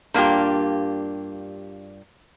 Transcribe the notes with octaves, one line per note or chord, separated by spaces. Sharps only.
G2 A#3 D4 F4 G4